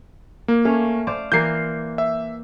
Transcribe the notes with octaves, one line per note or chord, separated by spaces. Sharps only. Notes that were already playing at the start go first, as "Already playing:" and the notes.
A#3
A3 C#4 F5
C5 D5 F5
E3 A#3 A#4 G6 C7
E5